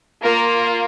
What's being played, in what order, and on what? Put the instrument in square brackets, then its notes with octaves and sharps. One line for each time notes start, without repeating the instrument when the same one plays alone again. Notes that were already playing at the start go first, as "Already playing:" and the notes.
[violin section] A#3 F4 A#4